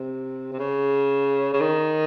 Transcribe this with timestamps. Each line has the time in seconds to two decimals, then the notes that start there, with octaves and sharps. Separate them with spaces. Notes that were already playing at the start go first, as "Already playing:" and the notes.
Already playing: C3
0.52 C3
0.59 C#3
1.54 C#3
1.61 D#3